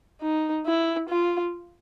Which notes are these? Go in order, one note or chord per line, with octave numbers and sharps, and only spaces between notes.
D#4
E4
F4